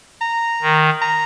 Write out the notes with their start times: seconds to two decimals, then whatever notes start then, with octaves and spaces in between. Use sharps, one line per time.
0.21 A#5
0.62 D#3
1.02 A#5